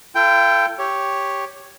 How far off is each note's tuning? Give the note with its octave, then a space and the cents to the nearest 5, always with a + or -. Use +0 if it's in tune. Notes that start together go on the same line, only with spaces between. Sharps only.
F4 -45 A4 +15 G5 +0
G4 +0 C#5 +0